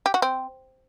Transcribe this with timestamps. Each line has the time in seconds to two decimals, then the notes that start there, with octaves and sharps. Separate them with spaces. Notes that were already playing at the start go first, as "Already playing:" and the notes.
0.06 G4
0.14 F#4
0.22 C4